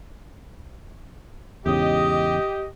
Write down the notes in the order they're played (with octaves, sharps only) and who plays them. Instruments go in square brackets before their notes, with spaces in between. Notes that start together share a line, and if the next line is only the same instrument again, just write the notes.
[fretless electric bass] E2 G#2 C#3 [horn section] G4 D#5